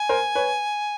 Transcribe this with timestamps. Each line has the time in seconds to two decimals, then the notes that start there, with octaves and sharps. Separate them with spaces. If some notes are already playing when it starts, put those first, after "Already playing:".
Already playing: G#5
0.09 A#4 C5
0.35 B4 C#5